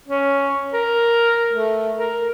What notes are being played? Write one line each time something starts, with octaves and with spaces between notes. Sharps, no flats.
C#4
A#4
A3
A#4